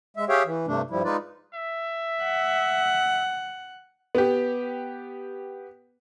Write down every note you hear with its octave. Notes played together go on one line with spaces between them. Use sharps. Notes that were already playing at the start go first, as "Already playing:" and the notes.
G#3 E5
G4 G#4 C#5 E5 F5 G5
E3
G2 C3 A3 D4
G2 F3 G3 E4
G#3 D#4 F4 B4 D5
E5
F#5
B3 G4